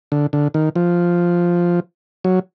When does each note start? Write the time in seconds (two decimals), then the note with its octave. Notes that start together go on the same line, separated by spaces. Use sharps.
0.12 D3
0.33 D3
0.54 D#3
0.76 F3
2.24 F#3